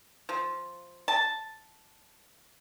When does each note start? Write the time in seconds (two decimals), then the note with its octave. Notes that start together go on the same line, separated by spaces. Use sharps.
0.29 F3
1.08 A5